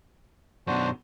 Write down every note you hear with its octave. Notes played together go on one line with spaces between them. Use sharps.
F#2 B2 D4 F#4 C5